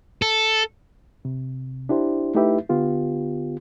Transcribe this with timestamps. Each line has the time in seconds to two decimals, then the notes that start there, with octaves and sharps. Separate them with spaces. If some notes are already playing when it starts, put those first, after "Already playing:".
0.22 A4
1.25 C3
1.89 D4 E4 G4 C5
2.35 A3 D#4 E4 G4 B4 E5
2.69 D3 B3 F4 G4